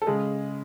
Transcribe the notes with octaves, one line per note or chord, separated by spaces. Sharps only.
A4
C#3 G#3 G#4